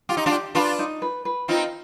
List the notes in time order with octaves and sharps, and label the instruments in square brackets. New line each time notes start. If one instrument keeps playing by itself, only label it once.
[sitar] F4 [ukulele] G4
[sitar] D#4
D4 F4
[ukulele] G4
[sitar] D4 F4 [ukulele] B4
[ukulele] D#4
B4
B4
[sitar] C4 D#4 [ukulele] F4